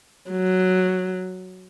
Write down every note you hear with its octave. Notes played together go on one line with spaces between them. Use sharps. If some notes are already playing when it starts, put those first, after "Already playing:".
F#3